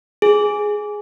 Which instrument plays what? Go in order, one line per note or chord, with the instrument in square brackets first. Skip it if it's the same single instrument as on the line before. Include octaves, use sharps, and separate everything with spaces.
[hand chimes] G#4